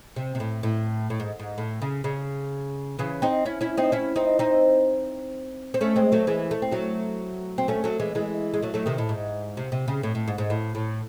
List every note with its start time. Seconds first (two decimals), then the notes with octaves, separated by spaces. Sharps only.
0.16 C3
0.35 C3
0.40 A2
0.63 A2
1.10 A2
1.20 G#2
1.39 G#2
1.58 A2
1.82 C#3
2.04 C#3
2.99 C#3 E3
3.22 C4 D#4
3.46 C#4 E4
3.61 C#4 E4
3.77 C4 D#4
3.92 C#4 E4
4.16 C4 D#4
4.39 C4 D#4
5.74 C4
5.81 A3 C#4
5.96 G#3 C4
6.12 F#3 A3
6.27 E3 G#3
6.51 A3
6.62 C4
6.71 F#3 A3
7.58 C4
7.68 A3 C#4
7.84 F#3 A3
8.00 E3 G#3
8.15 E3 G#3
8.54 G#3
8.62 F#3 A3
8.74 F#3 A3
8.86 C3 D#3
8.98 A2
9.09 G#2
9.57 C3
9.72 C3
9.88 C#3
10.03 A2
10.15 A2
10.28 G#2
10.38 G#2
10.50 A2
10.75 A2